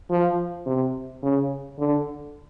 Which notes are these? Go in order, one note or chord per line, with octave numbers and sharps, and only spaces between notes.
F3
C3
C#3
D3